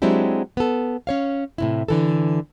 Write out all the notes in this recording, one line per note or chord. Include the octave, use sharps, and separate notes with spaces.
F#3 G#3 C4 D4 E4 G4
B3 A4
C#4 C#5 F5
A2 C3 E4
D3 E3 A4